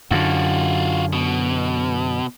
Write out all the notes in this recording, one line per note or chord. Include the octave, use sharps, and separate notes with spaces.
F#2 D3 F4 F#4
B2